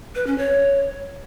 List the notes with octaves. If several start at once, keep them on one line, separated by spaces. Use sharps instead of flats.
B4
C#4
C#5